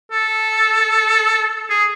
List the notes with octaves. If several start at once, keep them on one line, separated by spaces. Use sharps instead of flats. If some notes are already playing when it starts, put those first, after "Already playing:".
A4
G#4